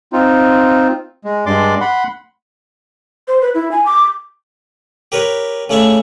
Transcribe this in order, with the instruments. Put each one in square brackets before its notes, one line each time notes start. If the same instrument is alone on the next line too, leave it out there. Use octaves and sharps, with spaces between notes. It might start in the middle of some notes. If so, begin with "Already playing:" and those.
[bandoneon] C4 D#4 F4
G#3
G2 G#3 D5 C6 D6
F#5 B5 C6
[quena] C5
B4
E4
G#5
D6
[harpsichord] G4 A#4 B4 C#5
C#3 A3 C#5 D5 E5 C#6